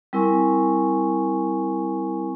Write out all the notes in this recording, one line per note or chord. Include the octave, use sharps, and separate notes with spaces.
G3 C4 E4 A#4 G#5 C#6